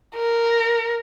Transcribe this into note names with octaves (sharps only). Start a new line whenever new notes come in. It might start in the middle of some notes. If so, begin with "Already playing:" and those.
A#4